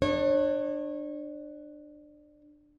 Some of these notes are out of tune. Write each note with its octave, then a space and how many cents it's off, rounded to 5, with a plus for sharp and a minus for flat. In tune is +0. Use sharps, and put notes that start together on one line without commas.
D4 +25 C#5 -30